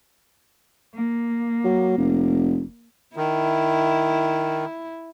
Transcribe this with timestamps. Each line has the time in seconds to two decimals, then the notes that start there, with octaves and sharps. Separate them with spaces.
0.94 A#3
1.64 F#3
1.97 F1
3.16 D#3 E4